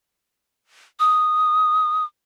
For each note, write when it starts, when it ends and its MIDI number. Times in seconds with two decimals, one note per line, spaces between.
1.00 2.04 87